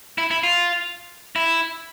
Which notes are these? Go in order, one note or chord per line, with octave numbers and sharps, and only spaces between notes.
E4
E4
F4
E4